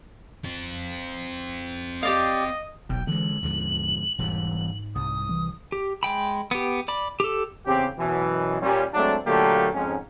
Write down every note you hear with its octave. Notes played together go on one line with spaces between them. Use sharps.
C4 F4
G4 D5 D#5 F5
E1 B1 B2 G5
D3 E3 G#3 F#7
D#2 G#2 D3 F3
E1 G#2 E3 G3
C2 D#6
E3
G4
G#3 G5 B5
B3 G4
D5 B5
G4 A4
E2 C#3 C4 G4
F#2 B2 E3
A#2 G3 C#4
F#3 G#3 A3 C4 D4
A#2 D3 F#3 A3 A#3 G4
F2 G#2 C#4